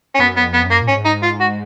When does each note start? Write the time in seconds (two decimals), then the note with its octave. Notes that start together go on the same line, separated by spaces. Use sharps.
0.15 C#4
0.19 F#2 B3
0.37 B3
0.42 F2
0.54 B3
0.66 F#2
0.71 A#3
0.82 A#2
0.88 G#2 C#4
1.05 D#4
1.23 F4
1.40 F#4